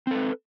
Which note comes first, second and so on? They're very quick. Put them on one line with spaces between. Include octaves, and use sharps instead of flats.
C4 A4 B4